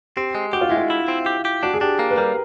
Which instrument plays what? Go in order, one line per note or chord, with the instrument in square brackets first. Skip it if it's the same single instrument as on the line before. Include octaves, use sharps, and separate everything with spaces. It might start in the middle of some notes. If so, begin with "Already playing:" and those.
[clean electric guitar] C4 [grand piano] G4
[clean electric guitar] G#3
[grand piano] F#4 [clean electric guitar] G4
[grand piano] F4
[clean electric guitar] G#3 [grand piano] E4
[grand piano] F4
[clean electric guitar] E4
C4
G4
G4
[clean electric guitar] D4 [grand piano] F#4
[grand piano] G#4
[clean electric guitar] D4 [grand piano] G4
[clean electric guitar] A#3
[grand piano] B4
[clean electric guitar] G3 [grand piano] A#4